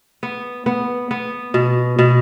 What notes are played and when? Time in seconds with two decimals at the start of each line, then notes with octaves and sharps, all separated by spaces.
0.23 B3
0.66 B3
1.11 B3
1.54 B2
1.99 B2